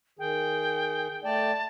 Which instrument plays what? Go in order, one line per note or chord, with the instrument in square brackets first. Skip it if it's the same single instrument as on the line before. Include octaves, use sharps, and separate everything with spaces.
[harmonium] D#3 G#4 [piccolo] G5
[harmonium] A3 D5 G5 [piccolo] A5